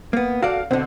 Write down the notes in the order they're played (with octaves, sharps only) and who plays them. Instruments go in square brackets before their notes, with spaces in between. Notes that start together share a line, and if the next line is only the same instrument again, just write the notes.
[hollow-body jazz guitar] A#3 B3
[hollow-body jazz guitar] F#4 A4 D5 [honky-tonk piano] F5
[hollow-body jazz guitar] B2 D3 [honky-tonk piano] C4